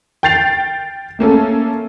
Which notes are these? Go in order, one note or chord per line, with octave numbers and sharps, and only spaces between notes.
G5 G6 A6 C7 F7
A3 A#3 C#4 A4